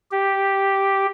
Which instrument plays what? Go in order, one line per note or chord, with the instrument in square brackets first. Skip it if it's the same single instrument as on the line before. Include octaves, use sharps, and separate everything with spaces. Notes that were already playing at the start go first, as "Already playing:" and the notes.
[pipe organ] G4